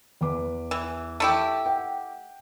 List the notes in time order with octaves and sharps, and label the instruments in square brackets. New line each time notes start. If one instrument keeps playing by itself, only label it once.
[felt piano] E2 B4 D6
[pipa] E3
A3 E4 G4
[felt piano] F#5 G5